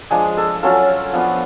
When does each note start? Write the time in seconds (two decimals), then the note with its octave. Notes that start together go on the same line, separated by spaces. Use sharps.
0.11 F3 G#3 D4 G#4
0.37 A4
0.63 F#3 C#4 F4 A4
1.13 F3 B3 D4